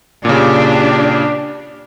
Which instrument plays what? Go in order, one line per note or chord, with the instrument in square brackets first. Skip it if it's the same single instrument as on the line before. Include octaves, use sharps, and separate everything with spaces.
[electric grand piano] A#2 C#3 [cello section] D4 G4